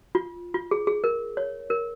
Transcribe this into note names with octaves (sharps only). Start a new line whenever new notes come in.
F4
F4
G#4
G#4
A#4
C#5
A#4